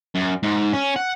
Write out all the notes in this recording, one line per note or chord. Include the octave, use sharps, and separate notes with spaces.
F#2
G#2
C#4
F#5